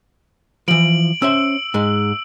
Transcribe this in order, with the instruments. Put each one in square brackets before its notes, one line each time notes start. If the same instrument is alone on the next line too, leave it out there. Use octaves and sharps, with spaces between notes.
[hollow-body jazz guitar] E3 F3 [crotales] D7 F#7
[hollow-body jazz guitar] C#4 C5 E5 [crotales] E6
[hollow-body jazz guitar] G#2 G#3